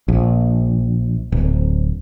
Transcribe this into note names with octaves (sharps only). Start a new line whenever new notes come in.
A#1
D1